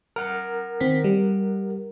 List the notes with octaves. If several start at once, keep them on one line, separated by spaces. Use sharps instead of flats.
A#4 F#5
D#3 C4 B6
G3